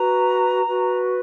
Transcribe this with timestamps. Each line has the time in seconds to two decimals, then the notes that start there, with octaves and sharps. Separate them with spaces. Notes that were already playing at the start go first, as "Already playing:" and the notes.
Already playing: F#4 B4 A#5
0.65 F#4 B4